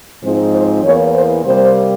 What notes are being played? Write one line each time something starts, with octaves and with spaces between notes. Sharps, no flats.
G#2 F3 G#3 C4 C5
C5
E2 E3 A#3 C#5
C5
C3 G3 A#3 C5